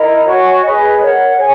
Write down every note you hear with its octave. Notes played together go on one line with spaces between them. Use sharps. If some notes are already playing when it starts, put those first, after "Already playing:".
Already playing: E4 A#4 D#5 A#5
F#4 C#5 G#5 C#6
G#4 B4 D#5
A#4 C#5 F#5
G#4 C#5 G#5